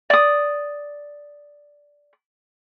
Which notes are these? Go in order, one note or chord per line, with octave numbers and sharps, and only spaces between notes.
D5 D#6